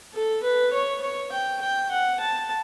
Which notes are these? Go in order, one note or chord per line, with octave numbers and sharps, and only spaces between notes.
A4
B4
C#5
C#5
G5
G5
F#5
A5